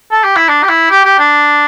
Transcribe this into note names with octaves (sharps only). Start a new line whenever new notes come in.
A4
G4
E4
D4
G4
E4
G4
G4
D4